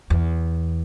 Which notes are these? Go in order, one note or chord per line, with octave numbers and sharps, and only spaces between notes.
E2